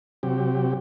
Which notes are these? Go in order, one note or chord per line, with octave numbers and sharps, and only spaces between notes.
C3 F#3 G4